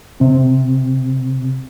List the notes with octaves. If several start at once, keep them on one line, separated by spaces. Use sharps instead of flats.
C3 C4